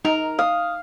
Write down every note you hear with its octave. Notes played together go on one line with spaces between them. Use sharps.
D#4 A#4
F5 D#6